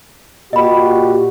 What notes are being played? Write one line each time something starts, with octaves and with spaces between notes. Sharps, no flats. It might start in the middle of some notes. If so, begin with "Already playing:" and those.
A#2 F#4 G4 D#5 B5